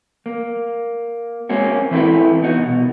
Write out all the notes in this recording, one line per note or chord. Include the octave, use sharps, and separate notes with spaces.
A#3
G#3 A#3 C4 C#4 F#4
E3 C4 E4 G4 A4 B4
B3 D#4 F#4
C2 B2